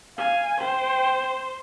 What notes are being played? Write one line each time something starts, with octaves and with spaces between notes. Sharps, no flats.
F5 G#5
C5 G5